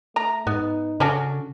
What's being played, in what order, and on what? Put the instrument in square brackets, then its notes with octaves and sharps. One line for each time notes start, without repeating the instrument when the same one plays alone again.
[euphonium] A3 [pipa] A#5
[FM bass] G#2 [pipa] B3 [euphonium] D#4
[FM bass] C#3 [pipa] C#4 D4 F#4 [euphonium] A4